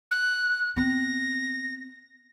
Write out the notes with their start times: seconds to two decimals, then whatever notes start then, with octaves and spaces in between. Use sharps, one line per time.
0.11 F#6
0.76 B3 C4 A#6